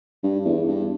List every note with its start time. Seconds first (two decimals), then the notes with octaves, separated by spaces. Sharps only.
0.23 G2
0.45 E2
0.68 G2